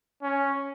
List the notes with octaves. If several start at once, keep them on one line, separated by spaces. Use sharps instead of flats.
C#4